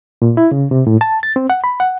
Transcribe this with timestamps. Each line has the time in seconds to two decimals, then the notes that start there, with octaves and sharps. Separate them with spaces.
0.22 A#2
0.37 E4
0.51 C#3
0.71 C3
0.87 A2
1.01 A5
1.23 A6
1.36 C4
1.50 F#5
1.64 B5
1.80 F#5